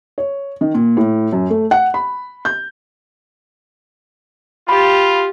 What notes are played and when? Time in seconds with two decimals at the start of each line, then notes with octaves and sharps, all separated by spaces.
0.18 C#5
0.61 D#3
0.74 A#2
0.97 A2
1.33 F#2
1.50 A3
1.71 F#5
1.94 B5
2.45 G6
4.69 F4 G4 F5 B5